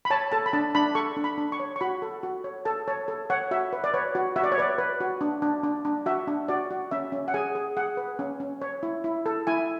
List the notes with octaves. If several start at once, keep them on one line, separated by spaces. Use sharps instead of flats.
B5
C#5 A5
A4 A5
B5
D4 A5
D4 B5
A4 C#6
D4
B5
D4
C#6
C#5
C#6
F#4 B5
A4
F#4
C#5
A4 A5
C#5 A5
A4
C#5 F#5
F#4 E5
B4
D5
B4 C#5
F#4
F#4 E5
D5
C#5
B4 D5
B4
F#4
D4
D4
D4
D4
F#4 E5
D4
F#4 D5
F#4
C#4 E5
C#4
F#5
G#4 G#5
G#4
G#4 F#5
B4
C#4
C#4
C#5
E4
E4
A4
E4 G#5